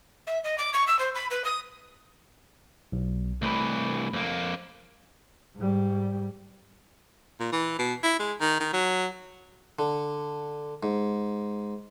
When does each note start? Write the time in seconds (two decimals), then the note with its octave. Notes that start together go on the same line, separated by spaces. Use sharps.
0.27 E5
0.44 D#5
0.58 D6
0.73 C#6
0.87 E6
0.99 C5
1.15 B5
1.31 B4
1.45 D#6
2.92 B1
3.42 C2 E3 A3 B5
4.13 F2 A#3
5.56 G#2 G3
7.40 A#2
7.52 E3
7.79 B2
8.04 E4
8.19 G#3
8.41 D#3
8.60 D#3
8.73 F#3
9.79 D3
10.83 G#2